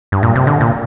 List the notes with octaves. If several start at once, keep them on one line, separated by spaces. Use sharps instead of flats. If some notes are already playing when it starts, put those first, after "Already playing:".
G2
A#2
C3
D3
A#2